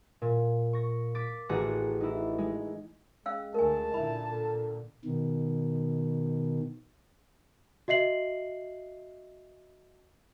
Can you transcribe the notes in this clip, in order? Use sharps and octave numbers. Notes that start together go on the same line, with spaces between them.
A#2
C#6 A#6
D6 A6 B6
A1 F#4 G#4 A#5 F#6 C#7
D#4 E4
G#3
G#3 C#4 F5 E6
D2 A3 A#4 G#5 A5
A#2 D3 E4 B5
A4
B2 D#3
F#4 D#5 E5 C7 F#7